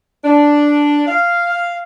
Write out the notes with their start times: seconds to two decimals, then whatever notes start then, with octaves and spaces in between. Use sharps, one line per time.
0.24 D4
1.08 F5